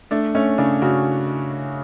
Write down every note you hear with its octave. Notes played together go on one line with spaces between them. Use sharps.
A3 D4
A3 C#4
C#3 D4
C#3 F#4